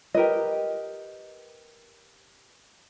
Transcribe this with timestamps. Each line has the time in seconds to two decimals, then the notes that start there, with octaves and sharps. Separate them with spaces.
0.14 G4 A#4 B4 D#5